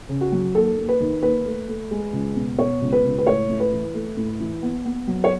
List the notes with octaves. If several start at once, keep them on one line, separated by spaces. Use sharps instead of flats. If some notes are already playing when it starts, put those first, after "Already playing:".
C#3
F#4
F#3
D#2 A4
D#2
B4
D#3
D#2 B4
A3
A3
G#3
C#2
B2
B2 C#5
C#2
B4
C#2
B4
A2 C#5
A2
B4
E3
A3
A2
E3
B3
B3
F#3
C#5